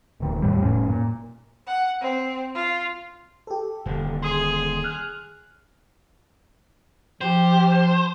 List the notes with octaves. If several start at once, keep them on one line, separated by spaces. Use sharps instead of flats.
D1 D#3
E2 A2 G3
F1 A2 C#4
A#2
F#5
C4
F4
G4 A4
D#1 D3
G#4 C6 D#6
F6 F#6
F3 G4 C5